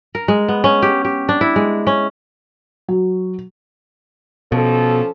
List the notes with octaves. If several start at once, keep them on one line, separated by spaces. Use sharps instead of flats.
A#4
G#3
B3
C#4
G4
G4
D4
E4
G#3
C#4
F#3
B2 F3 C#4 A4